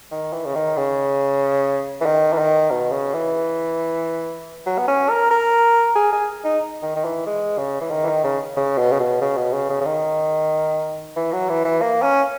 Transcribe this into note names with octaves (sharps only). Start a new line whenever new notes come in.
D#3
E3
C#3
D#3
C#3
E3
D#3
E3
D#3
B2
C#3
E3
F#3
B3
C#4
A#4
A#4
G#4
G#4
D#4
D#3
D#3
E3
G#3
C#3
E3
D#3
E3
D#3
C#3
C#3
B2
C#3
B2
C#3
B2
C#3
C#3
C#3
D#3
E3
F#3
E3
E3
A#3
C#4